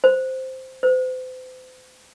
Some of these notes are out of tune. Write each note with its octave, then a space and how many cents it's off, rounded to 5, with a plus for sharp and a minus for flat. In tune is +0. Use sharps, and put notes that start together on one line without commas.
C5 -5
C5 -40